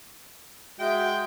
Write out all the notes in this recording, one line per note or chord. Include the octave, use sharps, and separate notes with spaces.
G#3 F#4 E5 G5